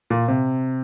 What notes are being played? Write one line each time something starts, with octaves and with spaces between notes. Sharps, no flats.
A#2
C3